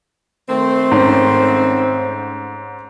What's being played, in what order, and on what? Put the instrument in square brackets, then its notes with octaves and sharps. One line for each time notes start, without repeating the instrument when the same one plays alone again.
[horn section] D#3 A3 C4
[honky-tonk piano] G#2 C#4